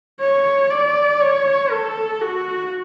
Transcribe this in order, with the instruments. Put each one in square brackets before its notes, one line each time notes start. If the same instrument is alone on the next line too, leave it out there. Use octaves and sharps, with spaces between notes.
[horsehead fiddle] C#5
D5
C#5
A4
F#4